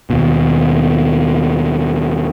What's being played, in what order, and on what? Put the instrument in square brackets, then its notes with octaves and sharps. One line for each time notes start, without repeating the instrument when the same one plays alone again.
[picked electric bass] D#2 B2